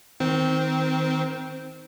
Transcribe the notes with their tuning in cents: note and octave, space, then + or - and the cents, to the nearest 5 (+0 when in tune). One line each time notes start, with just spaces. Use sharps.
D#3 +20 C4 -10